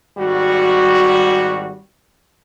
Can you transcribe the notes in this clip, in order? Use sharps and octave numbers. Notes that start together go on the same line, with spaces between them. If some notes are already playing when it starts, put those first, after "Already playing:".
G#1 G3 F#4